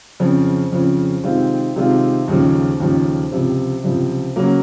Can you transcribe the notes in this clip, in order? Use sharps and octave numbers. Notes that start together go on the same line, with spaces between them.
F2 C#3 F3
F2 C#3 F3
C3 D#3 G#3 C4 F4
C3 D#3 G#3 C4 F4
D#2 C#3 F3
D#2 C#3 F3
C#2 C3 F3
C#2 C3 F3
C#3 F#3 A#3